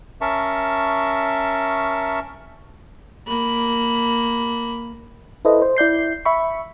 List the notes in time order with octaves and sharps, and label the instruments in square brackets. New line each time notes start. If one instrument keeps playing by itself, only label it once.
[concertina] C#4 A#4 E5 A5 C#6
[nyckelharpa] A#3 B5
[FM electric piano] E4 A4 B4 C5 D#5
C5
E4 D5 G6 C7
E5 B5 C#6